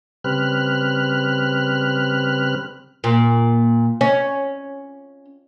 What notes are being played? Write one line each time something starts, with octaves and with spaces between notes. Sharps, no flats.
C#3 G3 C4 B4 F6 F#6
A#2
C#4